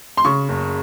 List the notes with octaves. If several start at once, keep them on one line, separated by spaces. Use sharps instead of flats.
C6
C#3 C#6
F#1